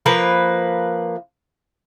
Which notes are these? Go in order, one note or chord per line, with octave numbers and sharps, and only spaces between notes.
F3 A#3 B4